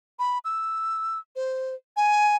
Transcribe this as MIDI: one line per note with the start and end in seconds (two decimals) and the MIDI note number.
0.19 0.39 83
0.45 1.18 88
1.36 1.75 72
1.97 2.36 80